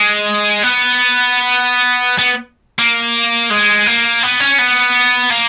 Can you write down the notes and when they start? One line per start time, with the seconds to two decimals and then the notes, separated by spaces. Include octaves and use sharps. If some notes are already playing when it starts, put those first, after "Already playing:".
Already playing: G#3
0.63 B3
2.18 B3
2.79 A#3
3.51 G#3
3.87 A#3
4.23 B3
4.40 C#4
4.59 B3
5.30 A#3